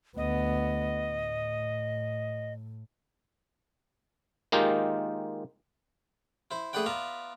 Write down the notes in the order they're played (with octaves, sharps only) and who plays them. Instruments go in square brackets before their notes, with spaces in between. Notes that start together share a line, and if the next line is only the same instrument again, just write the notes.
[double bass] D2 B3 [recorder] D#5
[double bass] A2
[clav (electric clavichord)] D#3 G#3 A#3 D#4 F4 G4
[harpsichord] E4 C5
A3 G#4 B4 D5 F#5 G5
B3 F4 D5 E5 A#5